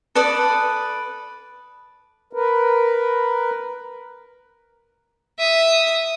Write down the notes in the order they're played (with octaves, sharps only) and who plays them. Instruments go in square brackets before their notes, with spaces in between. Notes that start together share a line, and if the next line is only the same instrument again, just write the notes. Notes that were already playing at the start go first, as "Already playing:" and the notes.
[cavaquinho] A4 B4 D5 D#6
[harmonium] A#4 B4
[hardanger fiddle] E5 D#6